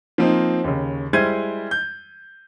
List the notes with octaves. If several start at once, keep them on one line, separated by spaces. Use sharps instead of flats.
F3 A#3 C4 D#4
D#2 C#3
G3 G#3 E4 C5 G#6 D#7
G6